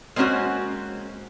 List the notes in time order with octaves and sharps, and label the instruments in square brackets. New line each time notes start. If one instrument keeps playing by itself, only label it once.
[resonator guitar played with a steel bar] G#3 A#3 C4 C#4 F#4